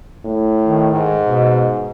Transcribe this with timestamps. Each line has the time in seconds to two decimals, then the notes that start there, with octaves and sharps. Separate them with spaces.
0.25 A2
0.62 D#3
0.91 G#2
1.22 B2